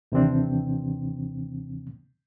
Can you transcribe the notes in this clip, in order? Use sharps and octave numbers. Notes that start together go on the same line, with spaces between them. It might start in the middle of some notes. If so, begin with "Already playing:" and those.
D#2 C3 E3 C4 D4